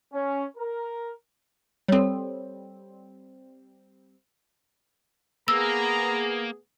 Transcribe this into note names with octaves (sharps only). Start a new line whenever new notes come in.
C#4
A#4
G3 C4 A4 C#5
A#3 B3 G#4 A#5 E6